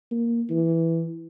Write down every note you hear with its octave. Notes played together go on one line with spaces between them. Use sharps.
A#3
E3